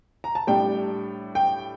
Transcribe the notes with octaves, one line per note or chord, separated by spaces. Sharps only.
A#5
A5
A2 G3 D4 G5
G5